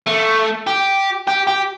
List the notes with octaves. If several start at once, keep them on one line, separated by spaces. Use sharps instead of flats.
A3
G4
G4
G4